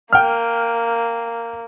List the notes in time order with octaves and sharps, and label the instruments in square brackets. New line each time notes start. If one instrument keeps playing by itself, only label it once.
[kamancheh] A#3 [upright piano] G5 F6